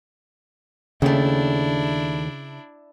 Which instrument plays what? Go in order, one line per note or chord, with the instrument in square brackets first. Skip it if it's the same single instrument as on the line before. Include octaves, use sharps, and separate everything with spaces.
[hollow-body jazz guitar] D#2 A3 [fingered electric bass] C#3 [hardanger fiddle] D4 E4